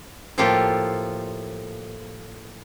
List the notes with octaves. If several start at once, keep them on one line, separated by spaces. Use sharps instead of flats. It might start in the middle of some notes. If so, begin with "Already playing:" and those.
A2 F3 A#3 F4 G4 A4